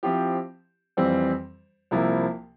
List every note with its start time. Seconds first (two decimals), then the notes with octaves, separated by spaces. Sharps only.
0.03 F3 C4 E4 G4
0.97 F2 E3 G3 C4
1.91 C2 C3 F3 A#3 E4